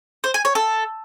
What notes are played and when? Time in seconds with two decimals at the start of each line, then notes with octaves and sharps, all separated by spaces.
0.24 C5
0.34 G#5
0.45 C#5
0.55 A4